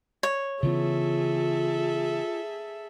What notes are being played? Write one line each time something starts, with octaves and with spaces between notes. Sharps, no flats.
C#5
C#3 E3 B3 F4 G#4 A4 E5